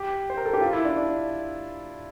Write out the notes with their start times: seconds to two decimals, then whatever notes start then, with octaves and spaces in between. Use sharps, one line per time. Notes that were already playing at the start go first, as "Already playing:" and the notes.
Already playing: G4
0.30 C5
0.37 A#4
0.46 A4
0.53 G4
0.61 F4
0.73 E4
0.85 D4
0.96 D4